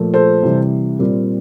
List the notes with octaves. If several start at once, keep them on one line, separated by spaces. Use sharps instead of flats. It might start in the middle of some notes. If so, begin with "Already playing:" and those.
Already playing: A#2 F3 A3
A4 C5
C3 E3 G3
A#2 G3 C4